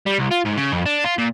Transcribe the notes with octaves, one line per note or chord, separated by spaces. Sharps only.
G3
C2
F4
G#2
C#3
F2
D4
F4
A#2